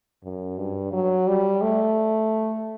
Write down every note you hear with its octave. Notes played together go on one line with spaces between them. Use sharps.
F#2
G2
F#3
G3
A3